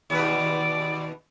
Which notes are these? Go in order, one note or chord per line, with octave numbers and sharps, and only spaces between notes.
D#2 B2 B4 D5